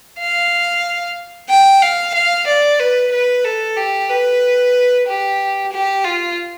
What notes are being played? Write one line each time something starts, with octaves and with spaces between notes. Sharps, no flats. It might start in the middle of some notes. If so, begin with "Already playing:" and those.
F5
G5
F5
F5
D5
B4
B4
A4
G4
B4
G4
G4
F4